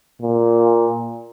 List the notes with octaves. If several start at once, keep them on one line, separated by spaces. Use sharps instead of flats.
A#2